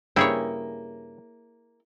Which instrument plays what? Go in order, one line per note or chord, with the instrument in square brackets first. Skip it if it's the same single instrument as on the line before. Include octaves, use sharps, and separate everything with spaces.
[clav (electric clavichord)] G2 C#3 G5 [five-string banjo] A#3 [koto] E4 G#4 C#5